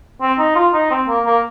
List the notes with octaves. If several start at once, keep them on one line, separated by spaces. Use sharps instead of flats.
C4
D#4
F4
D#4
C4
A#3
A#3